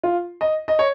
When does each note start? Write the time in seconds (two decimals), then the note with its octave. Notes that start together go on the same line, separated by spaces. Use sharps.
0.03 F4
0.41 D#5
0.68 D#5
0.79 C#5